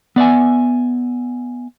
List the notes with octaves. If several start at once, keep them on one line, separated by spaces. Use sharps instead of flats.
B3 D5 E5 G#5